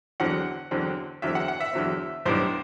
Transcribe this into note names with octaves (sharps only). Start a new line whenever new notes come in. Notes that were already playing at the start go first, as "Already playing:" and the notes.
E2 D3 F#3 C4 F#5
E2 D3 F#3 C4
E2 D3 F#3 C4 E5
F#5
F#5
E5
E2 D3 F#3 C4
B1 A2 G3 B3 D4 C5